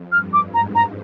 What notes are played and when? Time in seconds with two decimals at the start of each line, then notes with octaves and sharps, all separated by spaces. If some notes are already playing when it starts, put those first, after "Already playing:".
Already playing: F2
0.12 G2 F6
0.33 D6
0.53 G#2 A#5
0.75 A#5